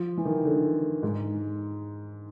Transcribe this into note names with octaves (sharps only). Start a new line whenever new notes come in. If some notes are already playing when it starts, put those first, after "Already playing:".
Already playing: F3
E3
D#3
D3
G#2